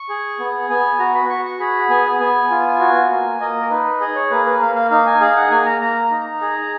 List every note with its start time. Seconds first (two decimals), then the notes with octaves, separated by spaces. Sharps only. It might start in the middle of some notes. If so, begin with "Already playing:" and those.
Already playing: C#6
0.09 G#4
0.39 B3
0.70 B3 G#5
0.99 F#4 A#5
1.15 B5
1.29 F#4 C#6
1.45 C#6
1.60 G#4 B5
1.90 B3 G#5
2.20 B3 G#5
2.51 F4
2.80 F#4
3.10 A#3
3.41 A#3 D#5
3.61 A#4
3.71 D#4 B4
4.00 G#4 D#5
4.16 C#5
4.30 A#3 B4
4.46 B4
4.61 A#3 F5
4.75 F5
4.91 D#4 F5
5.06 G#5
5.21 G#4 F5
5.36 F#5
5.51 A#3 G#5
5.66 A#5
5.81 A#3 A#5
6.11 D#4
6.41 G#4